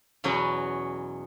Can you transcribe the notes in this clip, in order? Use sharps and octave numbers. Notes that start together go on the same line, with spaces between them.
E2 B2 F#3 B3 C#4